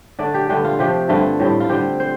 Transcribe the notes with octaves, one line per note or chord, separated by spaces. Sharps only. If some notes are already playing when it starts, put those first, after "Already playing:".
D3 A3 D4 D5
G4
G2 D3 A3 G4
F4
C3 F3 A3 G4
G2 D3 A3 C4 F4
A2 G3 C4
F4
D3 G3 C4 G4
C5